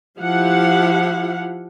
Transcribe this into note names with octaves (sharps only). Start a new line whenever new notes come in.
F3 E4 G4 F5 F#5